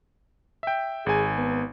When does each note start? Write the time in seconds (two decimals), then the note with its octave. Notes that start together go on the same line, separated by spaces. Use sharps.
0.63 E5 G5
1.06 G#1 G#4 G#5
1.36 B3